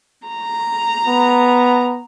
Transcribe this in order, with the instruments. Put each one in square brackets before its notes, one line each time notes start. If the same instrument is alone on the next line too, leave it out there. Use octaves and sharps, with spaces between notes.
[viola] A#5
[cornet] B3